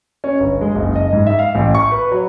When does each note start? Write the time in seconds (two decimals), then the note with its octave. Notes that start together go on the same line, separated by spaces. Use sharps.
0.24 C#4
0.40 G1
0.61 G#3
0.75 F#1
0.96 D#5
1.13 G#2
1.27 E5
1.39 F5
1.55 A1
1.75 C#6
1.91 B4
2.11 F#3